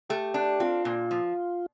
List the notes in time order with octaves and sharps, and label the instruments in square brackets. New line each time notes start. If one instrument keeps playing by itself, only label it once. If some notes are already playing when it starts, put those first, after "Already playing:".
[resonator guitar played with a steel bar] A3 [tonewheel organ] G4
[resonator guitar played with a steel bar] D4
[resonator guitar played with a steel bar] C4 [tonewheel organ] F4
[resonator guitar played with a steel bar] A#2
F3